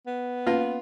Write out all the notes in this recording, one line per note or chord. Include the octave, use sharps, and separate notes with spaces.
B3
A#3 C#4 F4 B4